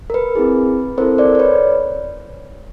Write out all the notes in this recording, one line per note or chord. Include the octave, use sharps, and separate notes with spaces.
A#4
B4
C4 E4 G#4
C4 E4 A4 A#4 C5
C5 D5
D5
B4 C#5